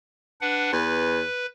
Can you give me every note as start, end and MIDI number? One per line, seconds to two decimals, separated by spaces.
0.41 0.71 62
0.41 0.71 71
0.41 0.71 78
0.73 1.23 40
0.73 1.46 71